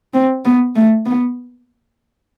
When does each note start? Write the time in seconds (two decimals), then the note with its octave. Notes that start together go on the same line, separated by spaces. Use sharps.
0.14 C4
0.45 B3
0.75 A3
1.06 B3